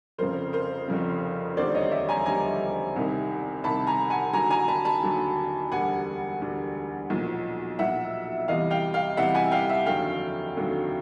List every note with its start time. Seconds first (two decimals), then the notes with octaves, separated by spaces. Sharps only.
0.18 F1 F2 C#3 A#4 C5
0.53 A#4 C5
0.88 F1 F2 C#3
1.56 E1 D#2 D3 G3 C5 D5
1.75 C#5 D#5
1.91 D5 E5
2.09 G#5 A#5
2.26 E1 D#2 D3 G3 G#5 A#5
2.96 C2 C3 D#3
3.64 C2 C3 D#3 A5 B5
3.87 G#5 A#5
4.10 F#5 G#5
4.33 D#2 D3 F#3 G#5 A#5
4.50 G#5 A#5
4.68 A5 B5
4.85 A5 B5
5.03 D#2 D3 F#3
5.72 E1 D2 D3 G3 F#5 G#5
6.40 E1 D2 D3 G3
7.10 B1 A#2 F3
7.79 B1 A#2 F3 E5 F#5
8.48 E2 C3 E3 G3 D#5 F5
8.71 F5 G5
8.94 F5 G5
9.17 E2 C3 E3 G3 E5 F#5
9.34 F#5 G#5
9.51 F5 G5
9.69 E5 F#5
9.86 F1 D#2 D3 F#3 F5 G5
10.56 F1 D#2 D3 F#3